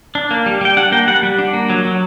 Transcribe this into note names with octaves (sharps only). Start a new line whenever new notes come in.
D4
A#3
G3
G3 G5
D4 F#5
A#3 G5
G3 F#5
G3
D4
A#3
F#3
F#3